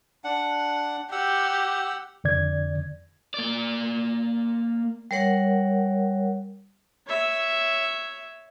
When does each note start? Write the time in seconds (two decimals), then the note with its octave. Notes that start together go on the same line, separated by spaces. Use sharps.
0.24 D4 F#5
1.12 G4 F#5 E6
2.24 F2 D3 D5 G#6
3.34 A#3 D5
5.11 G3 A#4 C#5 F#5
7.07 C#5 E5